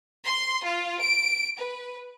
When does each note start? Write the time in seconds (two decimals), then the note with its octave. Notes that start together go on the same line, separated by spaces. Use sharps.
0.25 C6
0.63 F4
1.01 D7
1.57 B4